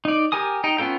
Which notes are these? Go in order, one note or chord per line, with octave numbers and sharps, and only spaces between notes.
D#4 D5
G4 A#4 G#5 D#6
D#4 G5
B3 C#4 F4 A4 G5